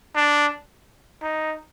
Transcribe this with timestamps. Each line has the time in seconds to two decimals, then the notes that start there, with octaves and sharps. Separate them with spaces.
0.15 D4
1.22 D#4